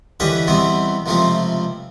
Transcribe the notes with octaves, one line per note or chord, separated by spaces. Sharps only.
D3 E3 C#4 G4 B4 D#5
E2 B2 E3 G3 B3 C4
C#2 C3 F3 A3 C4